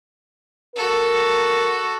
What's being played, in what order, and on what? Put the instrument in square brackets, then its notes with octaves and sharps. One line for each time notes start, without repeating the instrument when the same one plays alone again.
[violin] F#4 A4 [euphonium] A#4